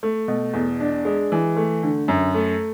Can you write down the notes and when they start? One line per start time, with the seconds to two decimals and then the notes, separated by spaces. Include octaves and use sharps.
0.03 A3
0.28 B2
0.53 E2
0.80 D4
1.05 G#3
1.32 E3
1.57 A3
1.83 D3
2.08 F#2
2.35 A3